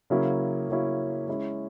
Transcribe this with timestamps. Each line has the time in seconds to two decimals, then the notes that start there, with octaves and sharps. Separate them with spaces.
0.10 C#3 F#3 A#3 C#4 E4
0.69 C#3 F#3 A#3 C#4 E4
1.28 G#3 C#4 E4